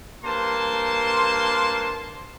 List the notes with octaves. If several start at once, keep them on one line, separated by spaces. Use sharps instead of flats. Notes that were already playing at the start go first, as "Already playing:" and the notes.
G2 A#3 C5 A5 C6